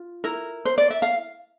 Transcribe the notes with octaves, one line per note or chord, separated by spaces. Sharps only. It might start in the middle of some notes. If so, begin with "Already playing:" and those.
Already playing: F4
E4 A#4
C5
D5
E5
F5